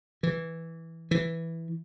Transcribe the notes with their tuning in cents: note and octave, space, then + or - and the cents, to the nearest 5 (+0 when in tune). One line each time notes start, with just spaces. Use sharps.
E3 -5
E3 +0